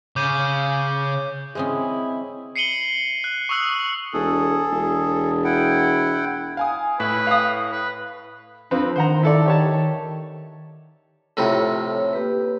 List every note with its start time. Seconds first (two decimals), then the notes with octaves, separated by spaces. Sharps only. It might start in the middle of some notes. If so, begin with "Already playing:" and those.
0.16 C#3 D6 G6 D#7
1.55 G#3 C4 C#4 E4 G#4 D#6
2.56 C7 C#7 D#7 F#7 G7
3.24 F#6
3.49 C#6 D#6 E6 F#6 F#7
4.13 E1 G#4 A4
4.71 E1
5.44 E4 F#5 G5
6.57 F5 G#5 D#6
7.00 A2 E4 B4
7.27 F5 D#6
7.72 B4
8.71 F2 C4 D4 B4
8.96 D#3 C5 F#5 A#5
9.23 E4 A4 D5
9.46 G4 C#5 A5
11.37 F2 A2 C3 C#5
12.13 A#3 G4 B4